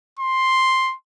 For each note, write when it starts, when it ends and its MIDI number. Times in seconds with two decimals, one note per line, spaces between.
0.19 0.94 84